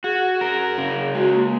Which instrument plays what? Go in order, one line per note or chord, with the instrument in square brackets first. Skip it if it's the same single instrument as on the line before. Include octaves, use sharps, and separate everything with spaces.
[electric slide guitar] F#4 [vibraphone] G#4
[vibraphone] G#4 [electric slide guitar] A#4
[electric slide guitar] C#3 [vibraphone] G#4
[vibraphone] G#4
[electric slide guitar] G#3 [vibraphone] F#4
[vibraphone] A#3